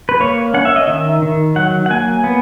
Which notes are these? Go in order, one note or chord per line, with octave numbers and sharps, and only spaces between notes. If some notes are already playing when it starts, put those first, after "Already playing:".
B4
A#3 C#5
C#4 F#5
E5
D#5
D#3 E5
D#3
F#3 F#5
F#5
A#3 G#5
B3